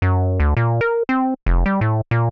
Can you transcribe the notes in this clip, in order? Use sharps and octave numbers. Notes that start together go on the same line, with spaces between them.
F#2
D2
A#2
A#4
C4
F1
G3
A2
A#2